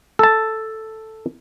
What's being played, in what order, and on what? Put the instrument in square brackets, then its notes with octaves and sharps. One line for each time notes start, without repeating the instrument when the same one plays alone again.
[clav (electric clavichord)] A4 A5